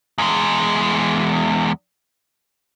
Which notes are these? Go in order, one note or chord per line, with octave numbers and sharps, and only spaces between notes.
E2 G#3